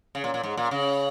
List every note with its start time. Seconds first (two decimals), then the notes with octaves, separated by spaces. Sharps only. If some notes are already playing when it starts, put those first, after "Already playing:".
0.15 C#3
0.24 A#2
0.34 A#2
0.43 G#2
0.57 A#2
0.71 C#3